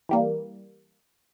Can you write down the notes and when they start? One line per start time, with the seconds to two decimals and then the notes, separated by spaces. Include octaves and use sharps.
0.09 E3 G3 A#3